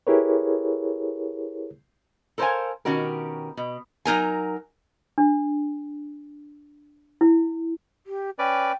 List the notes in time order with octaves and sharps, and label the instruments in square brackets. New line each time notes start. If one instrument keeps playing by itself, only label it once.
[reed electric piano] E4 G4 G#4 A#4 B4 C#5
[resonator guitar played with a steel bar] A4 A#4 C5 C#5 F5 G#5
B2 D#3 C#4 F#4 G4 A#4
B2
F#3 D#4 A#4 G#5
[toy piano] D4
E4
[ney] G4
[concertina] C#4 B4 D5 [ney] G5